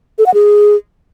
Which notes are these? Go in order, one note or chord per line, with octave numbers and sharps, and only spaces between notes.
A4
F#5
G#4